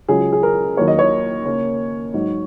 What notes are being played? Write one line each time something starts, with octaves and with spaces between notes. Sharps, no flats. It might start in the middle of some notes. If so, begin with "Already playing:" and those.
C#2 C#3 F#3 C#4 G#4
G#4
A#4
D#2 D#3 F#3 A#3 C#5
D#5
C#5
C#3 A#3 C#4
G#2 F#3 D#4